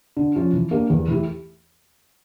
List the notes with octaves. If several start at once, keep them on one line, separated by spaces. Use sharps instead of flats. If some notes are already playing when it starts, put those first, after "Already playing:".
D3
F3 C#4 F4
E3
A#3 D4 G4
E2
E3 A3 E4 G4